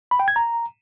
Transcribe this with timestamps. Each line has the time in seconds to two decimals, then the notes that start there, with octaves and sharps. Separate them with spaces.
0.11 B5
0.20 G5
0.28 G#6
0.36 A#5